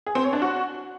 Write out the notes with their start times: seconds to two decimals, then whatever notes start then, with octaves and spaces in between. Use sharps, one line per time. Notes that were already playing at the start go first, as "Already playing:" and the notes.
0.06 G#4
0.15 C4
0.24 C#5
0.33 D4
0.42 F#4